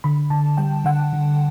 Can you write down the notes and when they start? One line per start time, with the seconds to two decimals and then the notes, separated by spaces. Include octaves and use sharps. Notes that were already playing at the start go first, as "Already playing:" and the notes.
0.04 D3 B5
0.30 D3 A5
0.57 G3 G5
0.85 D3 F#5
1.13 D3